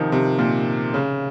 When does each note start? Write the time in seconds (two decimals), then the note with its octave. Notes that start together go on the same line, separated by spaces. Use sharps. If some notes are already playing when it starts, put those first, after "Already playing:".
Already playing: C3 D#3 F3
0.12 C3
0.39 A#2
0.94 C#3